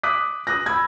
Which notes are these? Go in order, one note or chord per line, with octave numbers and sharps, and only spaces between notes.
D6 D#6 F#6 B6
D#6 F#6 A#6
B5 E6 G#6